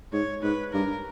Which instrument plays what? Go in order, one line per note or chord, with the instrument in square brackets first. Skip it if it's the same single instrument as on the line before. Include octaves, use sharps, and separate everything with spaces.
[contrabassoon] G#2 [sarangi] C#5
[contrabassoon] G#2 [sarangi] B4
[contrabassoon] G2 [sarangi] A#4